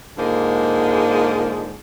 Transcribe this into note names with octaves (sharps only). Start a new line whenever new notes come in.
G#2 D3 G#3 A#3 F4 C5